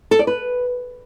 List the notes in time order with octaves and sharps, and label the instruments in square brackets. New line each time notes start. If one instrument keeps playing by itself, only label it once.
[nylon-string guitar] A4
D5
B4